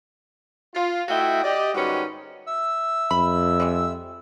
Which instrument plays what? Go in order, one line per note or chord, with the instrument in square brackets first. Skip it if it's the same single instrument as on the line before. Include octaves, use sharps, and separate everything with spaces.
[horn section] F4
A3 E4 F#4 D#5 E5 G5
G4 D5 D#5
G#2 D#3 G3 C#4 F#4 B4
[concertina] E5 E6
[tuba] F2 [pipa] B5
[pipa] G3 G#3